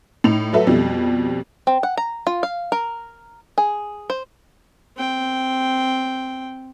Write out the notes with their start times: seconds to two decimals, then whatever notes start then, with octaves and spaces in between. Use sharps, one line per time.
0.24 A2 D#4 F7
0.53 F#3 A3 F#4 A4 B4 E5
0.67 F2 B2 G3
1.67 C4
1.83 F#5
1.97 A#5
2.27 F4
2.43 F5
2.72 A#4
3.58 G#4
4.10 C5
4.97 C4 G5